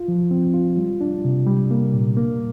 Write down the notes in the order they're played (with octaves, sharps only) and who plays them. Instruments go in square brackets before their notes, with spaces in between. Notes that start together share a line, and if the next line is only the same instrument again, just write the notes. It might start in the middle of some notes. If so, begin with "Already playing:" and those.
Already playing: [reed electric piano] F4
F3
C4
F4
G3
D4
C3
G3
A#3
A#2
A#3